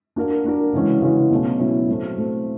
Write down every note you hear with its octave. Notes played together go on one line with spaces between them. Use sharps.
A#3 D4 F#4 A#4
A#3 D4 F#4 A#4
C#3 E3 G#3 C#4 F#4
C#3 E3 G#3 C#4 F#4
B2 F#3 A3 C#4 E4
B2 F#3 A3 C#4 E4
A2 F#3 A3 C4
A2 F#3 A3 C4